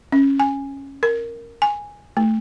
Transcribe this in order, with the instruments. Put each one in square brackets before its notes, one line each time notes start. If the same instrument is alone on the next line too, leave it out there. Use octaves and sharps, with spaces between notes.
[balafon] C#4
G#5
A#4
G#5
A3